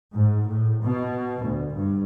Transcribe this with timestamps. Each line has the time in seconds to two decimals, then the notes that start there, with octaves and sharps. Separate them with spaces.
0.14 G#2
0.48 A2
0.82 B2
1.43 D2
1.74 G2